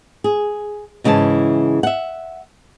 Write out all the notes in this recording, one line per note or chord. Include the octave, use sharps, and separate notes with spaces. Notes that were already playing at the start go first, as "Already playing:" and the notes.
G#4
G#2 C#3 E3 E4 A5
E5 F#5